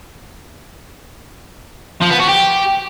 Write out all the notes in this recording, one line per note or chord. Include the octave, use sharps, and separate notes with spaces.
F3
B3
F#4
G4